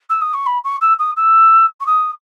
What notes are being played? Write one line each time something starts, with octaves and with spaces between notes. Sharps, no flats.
E6
D#6
C#6
B5
C#6
E6
D#6
E6
C#6
D#6